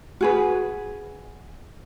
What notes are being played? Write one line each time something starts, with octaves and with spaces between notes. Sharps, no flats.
F#4 G#4 B4